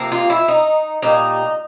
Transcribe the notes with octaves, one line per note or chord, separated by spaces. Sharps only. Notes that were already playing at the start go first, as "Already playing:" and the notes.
Already playing: C3 F3 A#3
F4
E4
D#4
A#2 G3 A#3 D#4